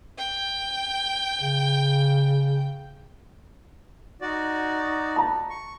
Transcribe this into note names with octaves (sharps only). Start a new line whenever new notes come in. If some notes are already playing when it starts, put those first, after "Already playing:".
G5
C#3
D#4 F#4 D5
A5 A#5
C#6